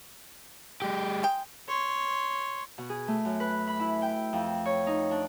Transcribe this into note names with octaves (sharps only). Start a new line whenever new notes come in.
G#3 G4
G#3 G5
C#5 C6
B2
G#4
A3
F#2
B4
B5
E4
G5
F2
C#5
D#4
D4